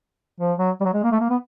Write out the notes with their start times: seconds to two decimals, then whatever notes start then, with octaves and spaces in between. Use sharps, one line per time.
0.40 F3
0.58 F#3
0.81 G3
0.85 F#3
0.94 G#3
1.03 A#3
1.12 A3
1.20 A#3
1.30 B3